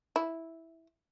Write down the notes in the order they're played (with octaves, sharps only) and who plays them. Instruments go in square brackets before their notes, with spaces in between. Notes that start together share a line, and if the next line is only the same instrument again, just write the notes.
[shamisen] E4